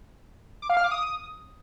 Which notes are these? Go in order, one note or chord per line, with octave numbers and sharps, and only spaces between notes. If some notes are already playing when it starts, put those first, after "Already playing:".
D6
F5
F6
D6
D#6